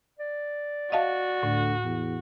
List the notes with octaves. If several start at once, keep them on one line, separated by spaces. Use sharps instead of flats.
D5
F#4 D#5 F5 A5
D2 A2
E2